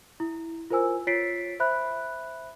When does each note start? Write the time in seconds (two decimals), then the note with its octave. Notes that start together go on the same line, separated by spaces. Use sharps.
0.20 E4
0.70 F4 A#4 C5 G#5 E6
1.07 F4 C#5 A6 B6 C7 D7
1.60 C5 E5 B5 F#6